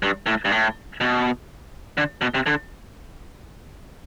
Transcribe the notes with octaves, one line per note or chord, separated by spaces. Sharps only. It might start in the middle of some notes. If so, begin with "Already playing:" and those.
G2
A2
G2
A2
B2
D3
B2
C3
D3